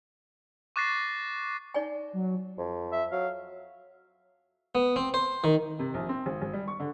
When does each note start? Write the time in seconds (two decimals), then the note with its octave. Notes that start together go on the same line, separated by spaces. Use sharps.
0.76 C#6 D6 F#6 A6 A#6 C7
1.74 D#4 D5 G#5
2.13 F#3
2.58 F2
2.92 E5
3.12 F#3 F5
4.75 B3
4.96 C4
5.14 C5
5.44 D#3
5.79 C3
5.94 A#1
6.09 C4
6.26 G#1
6.42 G#1
6.53 G3
6.68 C#6
6.80 D3